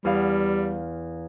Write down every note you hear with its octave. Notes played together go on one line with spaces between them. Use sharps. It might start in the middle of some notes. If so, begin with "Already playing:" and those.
E2 G3 F5